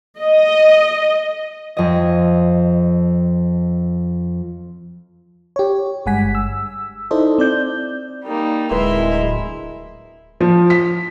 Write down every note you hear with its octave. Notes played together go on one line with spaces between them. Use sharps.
D#5
F2 D#5
G4 C#5
G1 G2 G#3 F#5 G#5 B6
E6
D#4 E4 A4 C5 D5 D#5
C4 D5 G6
G3 A#3 D#4
D1 G#3 E4 A#4 B4 E5 C6
F3
B6